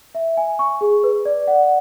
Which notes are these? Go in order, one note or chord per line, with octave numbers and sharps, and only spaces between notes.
E5
G#5
C#6
G#4
B4
D5
F#5